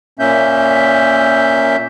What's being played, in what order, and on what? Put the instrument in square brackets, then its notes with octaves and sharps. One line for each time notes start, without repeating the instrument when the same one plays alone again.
[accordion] A#2 A#3 C#4 E5 G6